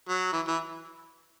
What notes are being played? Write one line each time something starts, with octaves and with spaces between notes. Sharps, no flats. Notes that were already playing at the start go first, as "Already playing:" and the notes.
F#3
E3
E3